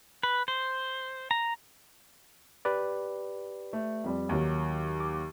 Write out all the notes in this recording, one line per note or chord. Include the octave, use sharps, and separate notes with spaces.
B4
C5
A#5
G4 B4 D5
A3
F2 G3
D#2 D#3 F#3
D6